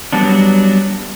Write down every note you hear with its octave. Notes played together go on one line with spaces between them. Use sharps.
F#3 G3 B3 D4